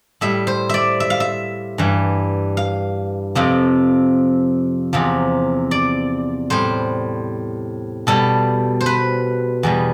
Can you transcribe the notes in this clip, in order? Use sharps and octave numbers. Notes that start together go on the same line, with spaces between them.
A2 G3 E5
C5
D5 E5
E5
F5
E5
G2 E3 G3
F5
F2 C3 F3
E2 C3 F3
D5
A2 G3 C5
B2 G3 A4
C5
B4
E2 B2 G3